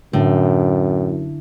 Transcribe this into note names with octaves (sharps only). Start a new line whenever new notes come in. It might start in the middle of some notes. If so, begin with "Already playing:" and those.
F#2 A2 D3